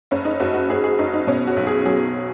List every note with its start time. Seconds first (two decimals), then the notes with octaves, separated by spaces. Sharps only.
0.11 F#1 C#4
0.25 D#4
0.40 F#1 F#4
0.54 F#4
0.70 F#1 G#4
0.84 G#4
0.98 F#1 D#4
1.13 D#4
1.27 B2 C#4
1.47 F#4
1.56 B1
1.67 G#4
1.85 F#3 G#4